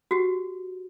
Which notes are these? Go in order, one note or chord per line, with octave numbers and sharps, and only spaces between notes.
F#4 G4